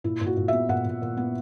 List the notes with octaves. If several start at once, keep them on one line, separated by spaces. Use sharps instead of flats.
A#2 E4
A#2
F#4
A#2
B3 E5
A#2 F#5
A#2
A#2
B3